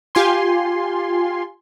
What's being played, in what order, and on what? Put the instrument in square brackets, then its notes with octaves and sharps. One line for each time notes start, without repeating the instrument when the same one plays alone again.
[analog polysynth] F4 G4 G#5 C6